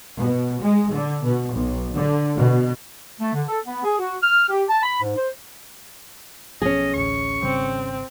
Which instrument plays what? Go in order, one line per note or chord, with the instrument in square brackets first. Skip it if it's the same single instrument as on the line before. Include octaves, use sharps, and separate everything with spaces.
[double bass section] B2
G#3
D3
B2
B1
D3
B2
[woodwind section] A3
D3
A4
B3
G#4
F#4
F6
G4
A5
B5
G#2
C5
[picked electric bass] B1 F3 B3 [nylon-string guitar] C#4 G#4 [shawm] D#5
[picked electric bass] A1 D2 [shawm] C#6
[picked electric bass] G#1 C#3 G3 [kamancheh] C4